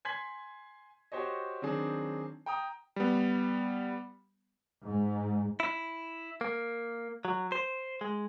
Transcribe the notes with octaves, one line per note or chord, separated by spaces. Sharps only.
G#5 C6 G#6 B6 F#7
F#4 G4 C5 C#5 D#5
D#3 F#3 C4 D4 G#4
G5 A#5 D#6
G3 B3
G#2
E4
A#3
F#3
C5
G#3